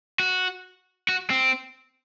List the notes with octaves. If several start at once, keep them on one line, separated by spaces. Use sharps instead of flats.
F#4
F#4
C4